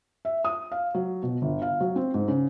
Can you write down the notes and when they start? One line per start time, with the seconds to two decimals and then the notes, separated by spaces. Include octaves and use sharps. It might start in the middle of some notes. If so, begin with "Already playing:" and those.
0.25 E5
0.45 D#6
0.72 F5
0.95 F#3
1.23 B2
1.42 G1
1.62 F5
1.80 F#3
1.96 C4
2.14 G#2
2.28 C#3